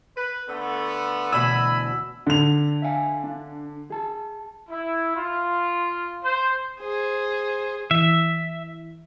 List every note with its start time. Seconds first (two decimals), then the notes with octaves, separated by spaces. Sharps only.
0.16 B4
0.48 D3 A3 B3
1.32 D2 B2 E3 G#5 B5 E6
2.26 D3 F7
2.82 E5 F5 G#5
3.24 D4
3.90 G#4 A5
4.69 E4
5.16 F4
6.23 C5
6.80 G#4 C5
7.91 E3 E5